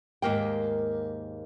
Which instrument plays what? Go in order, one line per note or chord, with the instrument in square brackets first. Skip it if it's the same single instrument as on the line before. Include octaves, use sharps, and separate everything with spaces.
[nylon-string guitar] D#2 G#2 A#3 G5